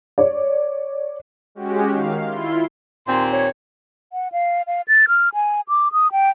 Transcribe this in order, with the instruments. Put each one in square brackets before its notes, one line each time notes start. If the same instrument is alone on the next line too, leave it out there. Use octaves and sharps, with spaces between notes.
[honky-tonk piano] C#5 D5
[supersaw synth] G#3 C#4 F#4 G4
D#3 F5
E4 F4 C6
[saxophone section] D#2 A#2 C4 [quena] C6
[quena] C#5
[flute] F#5
F5
F5
A6
F6
G#5
D6
D#6
G5